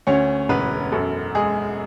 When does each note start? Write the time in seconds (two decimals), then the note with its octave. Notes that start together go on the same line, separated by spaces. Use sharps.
0.07 D2 C#4 C#5
0.49 E1 B3 B4
0.92 F#2 A4
1.35 G#3 G#4